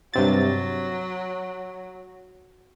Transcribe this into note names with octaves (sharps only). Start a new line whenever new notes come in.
G2 C3 F#3 A6